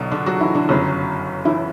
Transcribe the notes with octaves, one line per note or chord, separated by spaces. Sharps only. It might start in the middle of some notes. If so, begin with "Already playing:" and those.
Already playing: B1 B2 D3 F#3 D4
D3 D4
F#3 F#4
E3 E4
D3 D4
G1 F#2 C#3 F#3 C#4
E3 E4